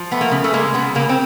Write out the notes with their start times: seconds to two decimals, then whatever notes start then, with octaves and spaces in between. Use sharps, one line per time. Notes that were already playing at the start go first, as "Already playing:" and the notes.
Already playing: F3
0.11 A3 B3
0.21 A#3
0.31 C#3
0.44 A3
0.53 G#3 A#3
0.74 C#3 B3
0.95 C#3 A#3
1.09 C4